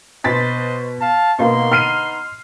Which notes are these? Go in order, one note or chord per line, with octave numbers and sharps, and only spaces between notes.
B2 B4 C5 D#5 A6 B6
F5 A5
B2 A#3 B3 D#4 C6
F6 C7 D#7